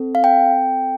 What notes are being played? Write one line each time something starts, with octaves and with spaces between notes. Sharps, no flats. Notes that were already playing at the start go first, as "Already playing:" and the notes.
Already playing: C4 A4
F5
G5